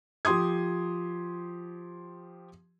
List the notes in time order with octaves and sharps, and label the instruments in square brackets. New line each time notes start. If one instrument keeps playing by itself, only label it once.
[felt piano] F3 G4 C6 D#6 G#6